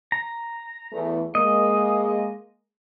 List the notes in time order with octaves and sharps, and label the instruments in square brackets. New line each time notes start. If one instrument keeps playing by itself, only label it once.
[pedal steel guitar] A#5
[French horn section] E2 E3 A3
[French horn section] G#3 A#3 [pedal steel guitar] D#5